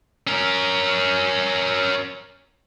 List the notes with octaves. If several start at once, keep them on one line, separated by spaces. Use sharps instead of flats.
C#4 A#4